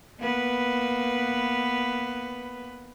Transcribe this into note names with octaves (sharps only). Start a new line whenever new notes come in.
A#3 B3 B4